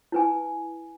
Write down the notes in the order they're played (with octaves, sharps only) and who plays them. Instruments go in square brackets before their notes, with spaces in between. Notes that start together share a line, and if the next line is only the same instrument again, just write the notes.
[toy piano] E4 B4 G#5